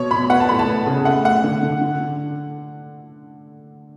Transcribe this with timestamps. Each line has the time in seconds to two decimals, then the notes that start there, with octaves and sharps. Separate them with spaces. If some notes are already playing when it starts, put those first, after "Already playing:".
Already playing: B2 C#5
0.11 B2 B5
0.30 B3 F#5
0.40 A5
0.49 A2 B5
0.59 A5
0.68 B3
0.86 C#3
1.05 A3 F#5
1.25 A3 F#5
1.44 D3
1.63 D3
1.81 D3
2.00 D3